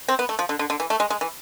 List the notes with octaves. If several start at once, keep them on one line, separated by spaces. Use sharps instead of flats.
C4
B3
A3
F3
D3
D3
D3
E3
A3
G#3
G#3
E3